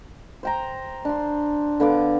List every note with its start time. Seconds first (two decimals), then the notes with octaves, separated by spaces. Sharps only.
0.43 C5 G5 A#5
1.05 D4 C6
1.80 D3 B3 F5 D6